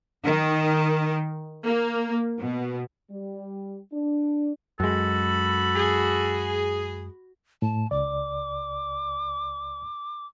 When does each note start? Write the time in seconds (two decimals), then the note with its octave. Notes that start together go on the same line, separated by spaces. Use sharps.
0.25 D#3
1.65 A#3
2.39 B2
3.11 G3
3.93 D4
4.80 F#2 G#3 F#4 A4 B5
5.76 G#4
7.62 A2 A5
7.91 C#2 D5 D6